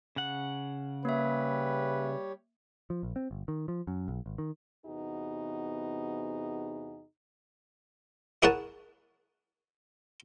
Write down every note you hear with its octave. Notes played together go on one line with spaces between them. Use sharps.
C#3 F#5
G3 A#3 G4 B4 C#5 E5
F3
A#1
C4
G1
D#3
F3
F#2
B1
G#1
D#3
E2 C3 B3 D#4 F#4 G#4
E4 G#4 A#4 C#5 F#5 A5